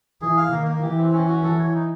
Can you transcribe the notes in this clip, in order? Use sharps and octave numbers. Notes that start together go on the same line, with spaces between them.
E3 G#4
F5
D#3 A#3
A#3
E3 G4
C4
C#4
F#4
E3 A4
C#5
D#4